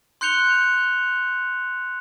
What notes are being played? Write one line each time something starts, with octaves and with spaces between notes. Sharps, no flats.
C6 F#6 G6 C#7 F7 G7